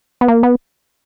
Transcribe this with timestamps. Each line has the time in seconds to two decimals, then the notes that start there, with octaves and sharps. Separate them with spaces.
0.21 B3
0.28 A#3
0.43 B3